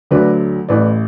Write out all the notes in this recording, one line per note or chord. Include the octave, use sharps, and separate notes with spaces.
D2 D3 F#3 B4 D5
A1 A2 E3 B4 D5